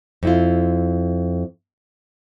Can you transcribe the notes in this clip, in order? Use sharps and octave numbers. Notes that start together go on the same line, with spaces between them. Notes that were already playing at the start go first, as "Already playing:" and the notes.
F2 E4 F4